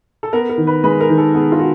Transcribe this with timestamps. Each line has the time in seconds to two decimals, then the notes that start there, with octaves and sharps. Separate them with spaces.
0.23 A4
0.33 B3 A#4
0.49 A#4
0.58 D#3
0.67 B4
0.84 G#3 B4
1.00 A#4
1.09 D#3
1.18 A4
1.35 B3 G#4
1.52 F4
1.59 F#4